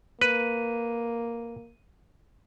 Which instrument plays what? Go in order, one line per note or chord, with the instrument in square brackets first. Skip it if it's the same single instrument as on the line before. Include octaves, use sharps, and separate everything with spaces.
[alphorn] A#3 [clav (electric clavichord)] B4 [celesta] D#7